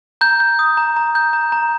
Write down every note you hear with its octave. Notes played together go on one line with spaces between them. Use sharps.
A#5 G6
G6
D#6
A#5
A#5
G6
A#5
A#5